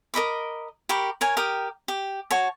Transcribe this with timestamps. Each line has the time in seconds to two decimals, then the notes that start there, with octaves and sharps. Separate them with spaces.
0.14 A#4 D#5 B5 D6
0.89 G4 A#4 B5 C#6
1.21 A#4 C#5 G#5
1.37 G4 A#4 G5 D#6
1.88 G4
2.31 F#4 C#5 A5